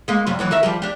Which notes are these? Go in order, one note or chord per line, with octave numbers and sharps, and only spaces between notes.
G#3 A#3
F#2 C3 G3
D#2 E3 F#3
D#3 A#4 E5
F3 G3 G4
D4 G4